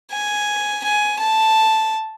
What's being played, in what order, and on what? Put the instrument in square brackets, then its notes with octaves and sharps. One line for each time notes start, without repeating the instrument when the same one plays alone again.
[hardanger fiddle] G#5
G#5
A5